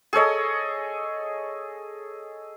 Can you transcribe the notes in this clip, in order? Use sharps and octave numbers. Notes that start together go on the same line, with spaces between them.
G#4 A4 C#5 D#5